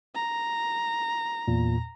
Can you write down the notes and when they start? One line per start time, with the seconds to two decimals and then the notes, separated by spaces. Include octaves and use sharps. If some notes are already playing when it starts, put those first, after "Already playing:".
0.15 A#5
1.48 E2 A#2